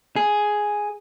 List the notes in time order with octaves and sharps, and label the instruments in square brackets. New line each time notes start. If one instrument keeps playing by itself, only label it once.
[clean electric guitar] G#4